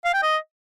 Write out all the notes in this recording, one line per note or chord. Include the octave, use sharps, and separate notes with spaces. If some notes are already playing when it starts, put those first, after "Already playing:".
F5
G5
D#5